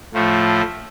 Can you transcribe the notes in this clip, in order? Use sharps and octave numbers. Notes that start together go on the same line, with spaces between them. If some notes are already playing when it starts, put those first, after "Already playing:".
A2 F3 A3